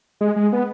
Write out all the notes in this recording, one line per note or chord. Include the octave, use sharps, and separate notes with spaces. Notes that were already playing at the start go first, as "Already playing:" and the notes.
G#3
G#3
B3